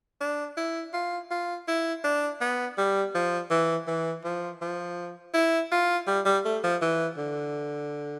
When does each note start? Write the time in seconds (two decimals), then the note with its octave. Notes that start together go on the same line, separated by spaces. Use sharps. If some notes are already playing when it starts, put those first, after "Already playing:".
0.21 D4
0.57 E4
0.93 F4
1.30 F4
1.68 E4
2.04 D4
2.41 B3
2.78 G3
3.15 F3
3.50 E3
3.87 E3
4.24 F3
4.61 F3
5.34 E4
5.72 F4
6.07 G3
6.25 G3
6.45 A3
6.63 F3
6.81 E3
7.17 D3